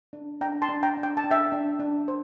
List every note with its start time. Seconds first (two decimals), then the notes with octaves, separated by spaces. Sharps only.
0.13 D4
0.41 D4 G5 A#5
0.62 A5 C6
0.69 D4
0.83 G5 A#5
0.97 D4
1.03 G5
1.17 A5
1.24 D4
1.31 E5 G5
1.52 D4
1.80 D4
2.08 C5